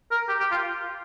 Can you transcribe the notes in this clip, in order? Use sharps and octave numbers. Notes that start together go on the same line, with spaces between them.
A#4
G4
G4
F4